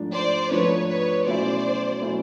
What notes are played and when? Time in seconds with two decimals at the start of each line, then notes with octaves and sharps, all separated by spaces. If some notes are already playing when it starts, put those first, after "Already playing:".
Already playing: G#2 F3 A3 D4
0.13 C5 D5
0.51 G#2 F3 A3 D4 B4 C#5
0.88 B4 C#5
1.26 B2 F#3 A3 C#4 E4 C5 D5
2.01 B2 F#3 A3 C#4 E4